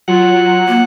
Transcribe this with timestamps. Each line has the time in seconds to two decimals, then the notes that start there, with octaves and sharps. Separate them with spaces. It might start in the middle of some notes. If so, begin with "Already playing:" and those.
0.08 F#3 F4 F#5
0.68 A#3